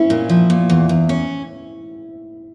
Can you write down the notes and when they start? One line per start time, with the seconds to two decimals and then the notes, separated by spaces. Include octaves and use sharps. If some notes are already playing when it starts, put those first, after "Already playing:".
Already playing: C#4 E4
0.10 A#2
0.29 F3
0.50 A#2
0.70 E2
0.89 E2
1.09 C#4